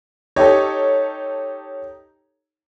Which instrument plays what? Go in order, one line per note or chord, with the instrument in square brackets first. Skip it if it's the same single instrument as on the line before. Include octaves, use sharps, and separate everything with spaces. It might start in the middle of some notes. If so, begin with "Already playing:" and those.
[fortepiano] D#4 G4 [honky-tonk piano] A4 C#5